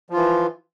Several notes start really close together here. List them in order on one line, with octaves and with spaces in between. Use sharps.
F3 F4 E3